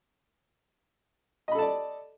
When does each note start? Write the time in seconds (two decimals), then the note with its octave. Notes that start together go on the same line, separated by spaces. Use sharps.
1.48 D#5
1.51 B5
1.55 A4
1.59 A5
1.62 D5